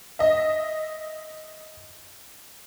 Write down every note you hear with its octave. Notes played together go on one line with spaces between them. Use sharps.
D#5 E5